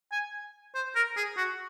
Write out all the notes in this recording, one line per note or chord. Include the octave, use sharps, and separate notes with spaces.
G#5
C5
A#4
G#4
F#4